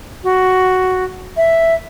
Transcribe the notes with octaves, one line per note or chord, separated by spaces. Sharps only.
F#4
E5